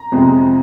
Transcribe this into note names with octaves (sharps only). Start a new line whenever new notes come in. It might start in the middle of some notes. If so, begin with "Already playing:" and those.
Already playing: A#5
F2 C3 F3 G#3 C4